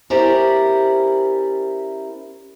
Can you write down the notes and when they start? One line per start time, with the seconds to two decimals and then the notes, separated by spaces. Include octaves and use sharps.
0.10 C#4 E4 G4 A#4 C5 D5